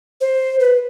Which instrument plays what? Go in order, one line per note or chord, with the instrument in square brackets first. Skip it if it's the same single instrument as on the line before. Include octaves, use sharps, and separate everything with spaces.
[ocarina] C5
B4